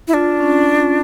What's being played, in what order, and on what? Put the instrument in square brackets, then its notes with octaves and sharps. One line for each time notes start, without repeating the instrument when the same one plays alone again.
[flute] E4
[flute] D4 [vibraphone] F4
[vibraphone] C#4
F4